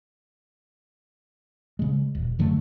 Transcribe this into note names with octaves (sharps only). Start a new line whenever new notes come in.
C#3 G#3
D#1
F#2 D3 F#3 A3